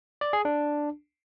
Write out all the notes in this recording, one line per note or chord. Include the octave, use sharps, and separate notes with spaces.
D5
G#4
D4